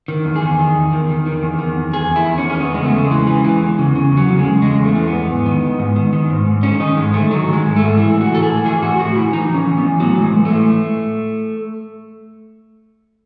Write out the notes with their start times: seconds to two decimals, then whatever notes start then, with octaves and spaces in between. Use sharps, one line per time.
0.08 D#3
0.25 E2
0.36 G#4
0.42 D#3
0.59 D#3
0.75 E2
0.93 D#3
1.09 D#3
1.26 D#3
1.43 E2
1.59 D#3
1.77 E2
1.93 E2 G#4
2.10 E2
2.16 E4
2.27 D#3
2.38 C#4
2.43 E2
2.50 C#4
2.60 E2 B3
2.74 C#3 G#3
2.83 A3
2.94 C#3
3.05 G#3
3.11 E3
3.27 E3
3.44 E3
3.61 E2
3.79 C#3
3.95 C#3
4.12 E2 F#3
4.29 C#3
4.39 G#3
4.45 C#3
4.62 E2 G#3
4.78 E2
4.85 A3
4.95 E3
5.07 B3
5.13 E2
5.29 G#2
5.46 D#3
5.62 D#3
5.79 G#2
5.96 D#3
6.13 D#3
6.30 G#2
6.46 G#2
6.63 D#3 C#4
6.80 D#3 D#4
6.97 G#2 G#3
7.13 D#3 A3
7.30 D#3 F#3
7.48 D#3
7.53 G#3
7.64 G#2
7.76 A3
7.82 G#2
7.97 E3 E4
8.14 A2
8.21 F#4
8.32 E3 A4
8.43 G#4
8.48 A2
8.65 E3 G#4
8.82 A2 F#4
8.99 A2 F#4
9.15 E3 E4
9.32 E3 D#4
9.50 E3 C#4
9.67 E3
9.78 B3
9.83 E3
10.00 A2 F#3
10.17 A2
10.22 G#3
10.33 E3
10.45 A2 A3